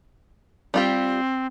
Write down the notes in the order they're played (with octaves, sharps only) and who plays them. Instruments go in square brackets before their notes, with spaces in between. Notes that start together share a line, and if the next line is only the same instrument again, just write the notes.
[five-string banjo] G3 F4 G4 [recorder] C4